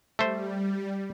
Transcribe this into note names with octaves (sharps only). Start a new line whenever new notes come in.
G3 A3 C5